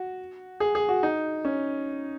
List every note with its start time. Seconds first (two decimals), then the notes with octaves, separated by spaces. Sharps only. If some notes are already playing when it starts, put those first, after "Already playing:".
Already playing: F#4
0.60 G#4
0.75 G#4
0.89 F#4
1.03 D#4
1.45 C#4